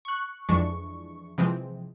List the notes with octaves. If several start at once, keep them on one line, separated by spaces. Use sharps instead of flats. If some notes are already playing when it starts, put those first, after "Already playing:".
C#6 F#6
F2 E3 G#3 D4 C#6
C3 E3 F3 G#3 C4